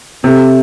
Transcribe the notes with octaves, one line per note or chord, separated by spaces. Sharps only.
C3 C4 A4 E5